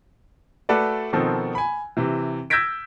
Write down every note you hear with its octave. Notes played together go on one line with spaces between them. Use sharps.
A3 F#4 A4 B4 D5
B2 D#3 F3 C4 D#4 A4
G#5 B5
C3 E3
E6 G6 G#6 A#6 B6 D7